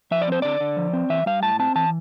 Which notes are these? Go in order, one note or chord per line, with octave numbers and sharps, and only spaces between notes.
F3 E5
D5
C4 C5
D3 D5
D3
F3
C4
E3 E5
G3 F5
A2 A5
C4 A5
E3 A5